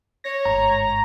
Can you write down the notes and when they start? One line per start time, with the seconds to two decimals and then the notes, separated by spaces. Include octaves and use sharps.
0.24 C#5 A#6
0.45 G1 G#2 A#5